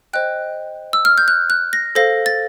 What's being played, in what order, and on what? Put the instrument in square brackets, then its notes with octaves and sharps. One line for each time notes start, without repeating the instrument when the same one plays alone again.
[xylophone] C5 D#5 G5 F#6
E6
F6
G6
F#6
F#6
A#6
A4 C5 F5 A#6
A6